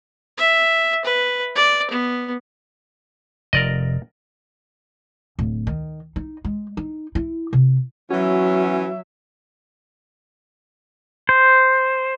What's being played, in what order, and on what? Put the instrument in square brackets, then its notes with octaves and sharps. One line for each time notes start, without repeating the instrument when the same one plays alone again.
[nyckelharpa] E5
B4
D5
B3
[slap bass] F1 [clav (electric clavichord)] A#4 D5 D#5
[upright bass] D1
D#3
D#4
G#3
D#4
E4
C3
[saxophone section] E3 B3 C#4 [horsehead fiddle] F#3 E5 [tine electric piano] F#4
[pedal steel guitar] C5